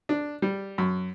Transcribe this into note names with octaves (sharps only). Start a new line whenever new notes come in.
D4
G3
F#2